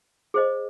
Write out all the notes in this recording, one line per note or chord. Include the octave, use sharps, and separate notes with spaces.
G#4 C5 D#5